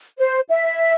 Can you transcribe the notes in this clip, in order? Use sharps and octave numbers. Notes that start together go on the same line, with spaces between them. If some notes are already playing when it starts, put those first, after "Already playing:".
C5
E5